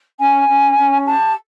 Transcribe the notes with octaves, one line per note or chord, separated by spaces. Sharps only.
C#4 G#5
C#4
C#4
G4 A5